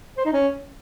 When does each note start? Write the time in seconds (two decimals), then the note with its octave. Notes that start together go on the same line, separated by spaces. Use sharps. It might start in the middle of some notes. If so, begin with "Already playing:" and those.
0.17 C5
0.25 D#4
0.33 C#4